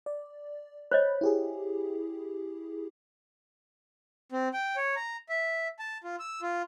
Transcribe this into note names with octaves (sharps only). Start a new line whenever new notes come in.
D5
C5 C#5 D#5 B5
E4 G4 G#4
C4
G5
C#5
A#5
E5
A5
F4
E6
F4